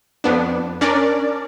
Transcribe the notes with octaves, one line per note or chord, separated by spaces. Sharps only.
F2 B3 D4
C#4 D4 A#4 D5